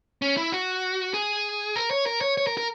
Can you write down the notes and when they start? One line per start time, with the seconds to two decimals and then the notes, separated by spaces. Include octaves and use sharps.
0.22 C#4
0.37 E4
0.52 F#4
1.14 G#4
1.76 A#4
1.91 C#5
2.06 A#4
2.21 C#5
2.37 C#5
2.47 A#4
2.57 A#4